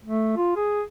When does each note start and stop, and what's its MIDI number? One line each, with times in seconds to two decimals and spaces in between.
0.04 0.33 57
0.37 0.56 65
0.56 0.82 68